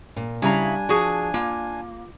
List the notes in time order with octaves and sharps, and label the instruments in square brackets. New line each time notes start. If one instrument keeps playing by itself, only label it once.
[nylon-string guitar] A#2
[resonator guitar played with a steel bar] C#3 E4 A#5 [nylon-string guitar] G3 F5 [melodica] D4 G#5
[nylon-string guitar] F3 [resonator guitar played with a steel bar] F#4 G#4
[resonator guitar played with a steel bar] A#3 [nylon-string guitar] F4